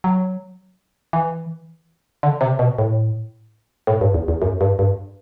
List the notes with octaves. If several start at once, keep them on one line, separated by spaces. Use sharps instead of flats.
F#3
E3
D3
C3
B2
A2
A2
G2
E2
E2
F#2
G2
G2